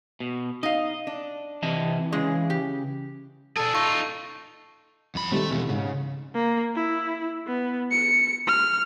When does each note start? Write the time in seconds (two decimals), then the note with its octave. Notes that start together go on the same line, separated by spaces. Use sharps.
0.20 B2
0.63 D#4 D#5 F5
1.07 D4
1.63 C3 E3 D#5 A5
2.12 C#3 G#3 G#4
2.50 G4
3.57 D4 G#4 A4
3.75 D#4 F4 C#6
5.15 F2 B5
5.32 D#3 G3 A3 C4 A4
5.51 B2 E3 G4
5.69 G#2 C#3
6.35 A#3
6.75 E4
7.47 B3
7.91 C#7
8.47 F6